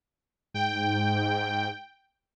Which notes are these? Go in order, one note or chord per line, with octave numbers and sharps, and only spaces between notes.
G#2 G5